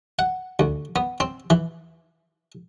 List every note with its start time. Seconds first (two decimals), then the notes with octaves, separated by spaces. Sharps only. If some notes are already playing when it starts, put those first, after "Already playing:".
0.19 F#5
0.59 D2
0.96 B3
1.20 C4
1.50 E3